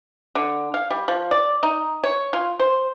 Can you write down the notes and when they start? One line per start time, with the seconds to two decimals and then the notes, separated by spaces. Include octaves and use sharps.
0.35 D3
0.74 F5
0.90 G3
1.08 F3
1.31 D5
1.63 D#4
2.03 C#5
2.33 F4
2.59 C5